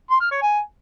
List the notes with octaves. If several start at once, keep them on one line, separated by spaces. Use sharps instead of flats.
C6
F6
C#5
G#5